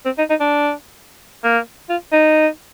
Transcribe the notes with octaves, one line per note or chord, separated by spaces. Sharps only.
C4
D#4
D#4
D4
A#3
F4
D#4